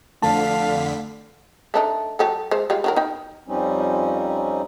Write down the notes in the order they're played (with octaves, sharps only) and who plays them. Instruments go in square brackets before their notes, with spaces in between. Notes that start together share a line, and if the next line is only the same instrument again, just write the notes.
[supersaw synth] F2 D3 B6 [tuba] A3 [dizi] F5 [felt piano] A5
[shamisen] A3 D4 D#4
F#3 G4 A4
G#3 C5
G3 G#3 F4
D#3 F#3 A#4
D#4 G5
[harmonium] F2 F3 G3 C4 C#4 D#4